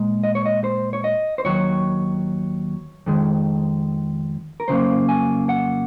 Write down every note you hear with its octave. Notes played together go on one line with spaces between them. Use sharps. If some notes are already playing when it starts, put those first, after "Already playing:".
Already playing: A#2 G#3
D#5
C#5
D#5
C5
C#5
D#5
C5
D#2 D#3 F#3 C#5
F2 D#3 G#3
A#4
F2 C#3 F#3 A#3 C5
G#5
F#5